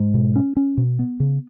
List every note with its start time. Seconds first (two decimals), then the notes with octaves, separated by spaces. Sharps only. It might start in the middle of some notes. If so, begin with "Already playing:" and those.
Already playing: G#2
0.14 B2
0.36 C#4
0.57 C#4
0.77 B2
0.99 B3
1.20 C#3